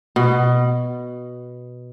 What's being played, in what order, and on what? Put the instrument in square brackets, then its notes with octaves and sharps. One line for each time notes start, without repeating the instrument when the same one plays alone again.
[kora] B2